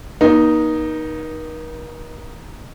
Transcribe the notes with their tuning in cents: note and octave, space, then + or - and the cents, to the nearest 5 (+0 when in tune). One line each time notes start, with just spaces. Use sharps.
A#3 +45 D#4 +0